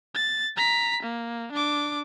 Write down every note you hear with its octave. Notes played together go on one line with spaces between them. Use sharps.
A6
A#5 B6
A#3
D4 D6